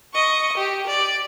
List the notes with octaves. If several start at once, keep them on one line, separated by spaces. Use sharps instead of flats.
D#5 C#6
G4
D5